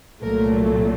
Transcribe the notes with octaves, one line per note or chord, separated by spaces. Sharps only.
C2 A#2 F#3 A3 A#4